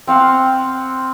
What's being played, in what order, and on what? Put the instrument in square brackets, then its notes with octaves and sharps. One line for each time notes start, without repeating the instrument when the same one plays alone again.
[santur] C4 F5 F#5 C6